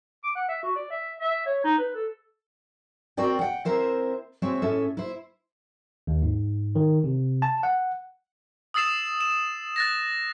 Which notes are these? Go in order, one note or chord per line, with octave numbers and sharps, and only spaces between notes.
D6
F#5
E5
F#4
D5
E5
E5
C#5
D#4
B4
A4
C4 F#4 A#4 D5 G5
F#5 G5
C4 E4 A#4 C5 E5
G#3 C4 F#4 C#5 E5
A2 C#4 A4 E5
E4 C5
D#2
G#2
D#3
C3
A5
F#5
D#6 E6 A6 C7 E7 F7
E7
F#6 A6 A#6